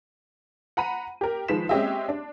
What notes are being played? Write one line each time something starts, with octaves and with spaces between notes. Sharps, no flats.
F#5 A#5 B5 D#7
G4 A#4
D#3 F3 G#3 B4 B6 E7
G#3 C4 C#4 G4 D#5 E5
D4